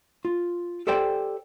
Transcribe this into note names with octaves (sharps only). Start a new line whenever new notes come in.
F4
G4 A4 C5 D5 G5